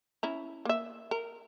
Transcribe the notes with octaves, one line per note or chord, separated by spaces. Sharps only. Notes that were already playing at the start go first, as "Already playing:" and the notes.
C#4 E4 A#5
A#3 E5
A#4